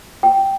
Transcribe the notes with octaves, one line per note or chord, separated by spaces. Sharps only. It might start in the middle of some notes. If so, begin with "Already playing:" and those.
G5